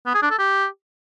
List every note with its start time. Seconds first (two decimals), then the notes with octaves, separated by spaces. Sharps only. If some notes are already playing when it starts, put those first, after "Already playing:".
0.06 B3
0.14 G#4
0.22 D4
0.30 A4
0.39 G4